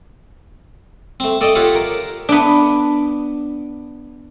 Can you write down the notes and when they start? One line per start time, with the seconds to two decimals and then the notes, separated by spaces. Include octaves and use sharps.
1.20 A3 C4
1.41 A3 A4 D5 D#5 G5
1.55 F4 G4 A4 C#5 F5 F#5
1.75 A#4
2.29 B3 D4